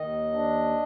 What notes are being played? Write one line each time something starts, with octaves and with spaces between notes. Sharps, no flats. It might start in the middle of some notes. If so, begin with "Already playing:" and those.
Already playing: D#2 D#3 D#5
D4